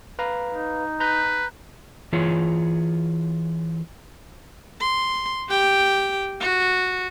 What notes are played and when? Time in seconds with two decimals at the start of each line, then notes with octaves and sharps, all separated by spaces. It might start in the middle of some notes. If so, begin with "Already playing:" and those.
0.19 B4 F5 A#5
0.52 D#4
1.00 B4 A#5 G6
2.13 E3 F4 G#4 C#5
4.81 C6
5.49 G4 G5
6.41 F#4